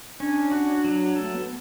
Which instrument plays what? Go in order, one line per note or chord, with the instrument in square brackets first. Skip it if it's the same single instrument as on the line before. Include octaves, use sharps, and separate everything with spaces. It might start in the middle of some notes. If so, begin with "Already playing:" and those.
[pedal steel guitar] C#4 [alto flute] D4
[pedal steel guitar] F#4
F#3
A4
[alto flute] A3
B3